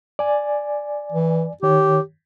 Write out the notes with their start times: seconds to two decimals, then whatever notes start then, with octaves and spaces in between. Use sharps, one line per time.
0.19 D5 G#5
1.13 E3
1.63 D#3 G4 C#5